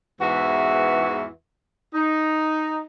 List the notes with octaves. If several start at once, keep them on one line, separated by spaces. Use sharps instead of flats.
E2 G#2 E3 F#4 B4 E5
D#4